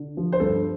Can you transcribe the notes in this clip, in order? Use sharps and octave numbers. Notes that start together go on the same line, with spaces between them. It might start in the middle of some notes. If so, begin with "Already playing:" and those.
Already playing: D3
F3
C5
G2 A4